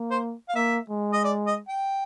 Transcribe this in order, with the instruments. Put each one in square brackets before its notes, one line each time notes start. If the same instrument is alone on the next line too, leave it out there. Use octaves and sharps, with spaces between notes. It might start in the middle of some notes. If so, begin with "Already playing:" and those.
Already playing: [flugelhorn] A#3
[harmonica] C5
F5
[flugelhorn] A#3 [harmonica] E5
[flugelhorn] G#3
[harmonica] D#5
D5
D#5
G5